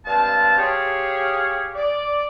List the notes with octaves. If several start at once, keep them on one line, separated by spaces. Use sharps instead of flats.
G2 G#3 C4 F5 A5
G4 G#4 C#5 F5
D5